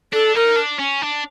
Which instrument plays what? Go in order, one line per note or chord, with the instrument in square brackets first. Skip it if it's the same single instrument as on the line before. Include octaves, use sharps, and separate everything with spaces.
[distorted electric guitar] D4 [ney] A4
[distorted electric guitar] D#4 [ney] A#4
[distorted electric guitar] D4
C#4
D4